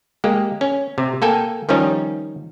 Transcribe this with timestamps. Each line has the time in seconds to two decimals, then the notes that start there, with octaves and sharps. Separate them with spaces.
0.24 G#3 A#3 G4
0.61 C#4
0.98 C3
1.22 A#3 A4 G5 G#5
1.69 D#3 F3 G3 C#4 D#4